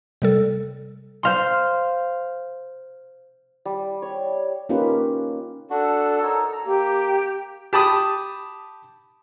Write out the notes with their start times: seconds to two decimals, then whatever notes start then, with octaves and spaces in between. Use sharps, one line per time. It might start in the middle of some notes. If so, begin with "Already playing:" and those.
0.22 C3 G3 A4
1.23 C5 F5 C6
3.65 G3
4.02 C#5
4.69 A#3 C#4 D#4 F4 G4 B4
5.70 D4 F#4 A4
6.23 D#4 A#4 C#5
6.53 A#5
6.66 A#3 G4
7.73 G4 A5 B5 D#6